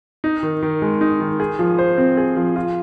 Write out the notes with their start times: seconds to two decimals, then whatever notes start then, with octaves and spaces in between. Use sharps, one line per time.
0.24 D#4
0.43 D#3
0.62 D#3
0.82 G#3
1.01 D#4
1.21 D#3
1.40 G#4
1.59 F3
1.79 C5
1.97 C4
2.17 G#4
2.37 F3
2.56 F4